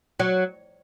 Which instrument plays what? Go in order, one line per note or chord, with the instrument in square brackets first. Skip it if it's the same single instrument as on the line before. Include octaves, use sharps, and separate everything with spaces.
[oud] F#3